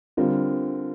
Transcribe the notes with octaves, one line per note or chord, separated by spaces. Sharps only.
D3 G3 C4 F4 A#4